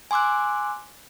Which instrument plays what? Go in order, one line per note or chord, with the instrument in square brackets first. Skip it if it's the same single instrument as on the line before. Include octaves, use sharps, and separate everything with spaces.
[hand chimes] G#5 C6 D6 E6 F#6